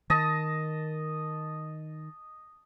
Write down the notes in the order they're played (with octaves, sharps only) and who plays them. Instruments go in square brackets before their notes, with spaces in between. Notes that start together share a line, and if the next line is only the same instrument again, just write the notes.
[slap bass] D#3 [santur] D#5 A5